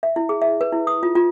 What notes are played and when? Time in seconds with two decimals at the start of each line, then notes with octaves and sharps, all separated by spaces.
0.03 E5
0.16 E4
0.29 G#4
0.42 E5
0.61 B4
0.72 E4
0.87 D#6
1.03 F4
1.15 F4